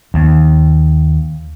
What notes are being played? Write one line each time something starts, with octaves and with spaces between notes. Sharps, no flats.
D#2